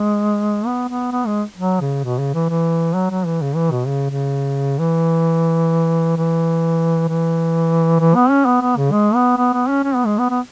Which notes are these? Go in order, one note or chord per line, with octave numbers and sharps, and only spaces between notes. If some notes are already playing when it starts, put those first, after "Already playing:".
Already playing: G#3
B3
B3
B3
G#3
F#3
C#3
B2
C#3
E3
E3
F#3
F#3
E3
C#3
E3
B2
C#3
C#3
E3
E3
E3
E3
B3
C#4
B3
B3
C#3
G#3
B3
B3
B3
C#4
C#4
B3
G#3
B3
B3